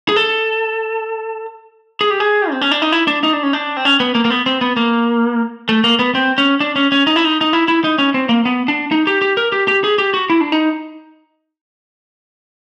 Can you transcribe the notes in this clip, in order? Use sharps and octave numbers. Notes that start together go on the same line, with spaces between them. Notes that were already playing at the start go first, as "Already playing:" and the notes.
G#4
A4
G#4
G4
G#4
C4
C#4
D4
D#4
E4
D4
D#4
D4
C#4
D4
C4
C#4
B3
A#3
A#3
B3
C4
B3
A#3
A3
A#3
B3
C4
C#4
D4
C#4
C#4
D#4
E4
D#4
D#4
E4
E4
D#4
C#4
C4
A#3
B3
D4
D#4
G4
G4
A#4
G4
G4
G#4
G4
F#4
E4
D4
D#4